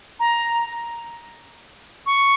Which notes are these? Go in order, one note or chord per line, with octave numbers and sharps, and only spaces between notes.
A#5
C#6